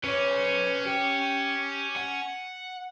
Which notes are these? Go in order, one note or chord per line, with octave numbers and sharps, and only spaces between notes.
C#4 B4 C#5
G4
F#5